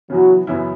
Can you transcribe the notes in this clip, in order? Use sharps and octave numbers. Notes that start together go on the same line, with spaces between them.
C#3 E3 F#3 B3 F#4
F#2 C#3 E3 B3 E4